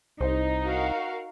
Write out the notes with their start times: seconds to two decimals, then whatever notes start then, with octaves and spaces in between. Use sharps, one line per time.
0.21 C2 D#4 C5
0.63 F#4 A#4 F5